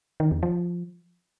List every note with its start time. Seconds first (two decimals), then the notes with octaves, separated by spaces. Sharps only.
0.20 D#3
0.31 E2
0.43 F3